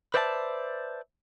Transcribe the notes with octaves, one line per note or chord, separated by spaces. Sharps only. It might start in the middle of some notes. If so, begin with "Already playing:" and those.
B4 C5 D5 E5 G#5 A5